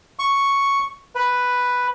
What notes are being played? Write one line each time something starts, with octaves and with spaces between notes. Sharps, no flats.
C#6
B4